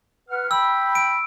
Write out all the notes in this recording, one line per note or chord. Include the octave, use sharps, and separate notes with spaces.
B4 F#5 F6
G5 B5 E6
D7